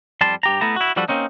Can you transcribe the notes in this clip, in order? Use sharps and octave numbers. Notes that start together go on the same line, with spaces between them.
F2 G3 A5 C6
G2 G4 A#5
A3 B3 E4 A5 A#5
E4 F#4
F3 G3 D4 F#4 A4 B4
A#3 C4 C#4 D#4